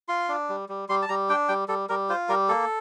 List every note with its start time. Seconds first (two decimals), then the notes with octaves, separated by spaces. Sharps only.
0.08 F4 C6
0.29 D4
0.49 G3
0.69 G3
0.89 G3 C6
1.02 A5
1.09 G3 A#5
1.30 D4 G5
1.48 G3 G5
1.68 G3 A4
1.89 G3 A#4
2.09 F4 C5
2.29 G3 A#4
2.49 A#3 A4